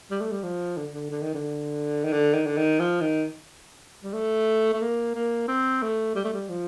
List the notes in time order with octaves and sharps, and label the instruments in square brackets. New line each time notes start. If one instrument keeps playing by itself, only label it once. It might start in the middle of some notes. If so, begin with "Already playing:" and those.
[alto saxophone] G3
A3
G3
F3
D3
D3
D3
D#3
D3
D#3
D3
D#3
D3
D#3
F3
D#3
G3
A3
A3
A#3
A#3
C4
A3
G3
A3
G3
F3